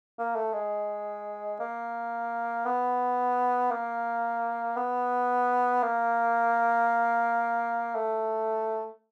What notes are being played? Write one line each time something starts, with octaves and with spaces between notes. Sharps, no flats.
A#3
A3
G#3
A#3
B3
A#3
B3
A#3
A3